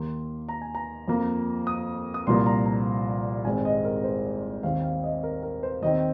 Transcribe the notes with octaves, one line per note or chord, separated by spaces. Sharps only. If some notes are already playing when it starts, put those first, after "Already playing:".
Already playing: D#2 D#3 A#3 C6
A#5
G#5
A#5
F2 F3 A#3
D#6
D#6
C2 A#2 F3 A#3 C6
A#5
A#5
G#1 G#2 G#3 C4 G#5
D#5
A#4
C5
D#2 D#3 C4 F5
F5
D#5
A#4
A#4
C5
D#2 D#3 C4 D#5